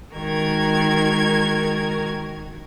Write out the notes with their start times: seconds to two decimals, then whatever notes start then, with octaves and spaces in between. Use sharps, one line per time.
0.13 D#3 G#3 F#4 A#4 G#6